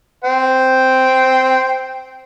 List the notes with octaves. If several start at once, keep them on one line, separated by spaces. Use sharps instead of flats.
C5 G5